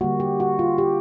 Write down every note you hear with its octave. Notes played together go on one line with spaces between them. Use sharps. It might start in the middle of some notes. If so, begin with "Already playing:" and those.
D3 G3 A#3 F#4
G4
F#4
F4
G4